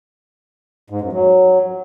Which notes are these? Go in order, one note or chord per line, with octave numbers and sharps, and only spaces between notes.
G#2
F#2
F#3